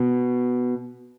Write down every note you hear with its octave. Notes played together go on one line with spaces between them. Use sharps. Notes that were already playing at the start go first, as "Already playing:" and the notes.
Already playing: B2